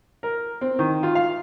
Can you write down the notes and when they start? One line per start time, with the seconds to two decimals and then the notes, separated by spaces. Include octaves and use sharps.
0.23 A#4
0.61 C4
0.79 D#3
1.03 F4
1.15 F5